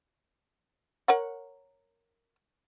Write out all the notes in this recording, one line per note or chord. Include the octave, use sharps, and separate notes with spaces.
A#4 C#5 F#5